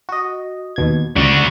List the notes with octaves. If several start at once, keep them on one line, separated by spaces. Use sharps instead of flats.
F#4 D#5
D#2 B2 G#6
C#2 D3 F#4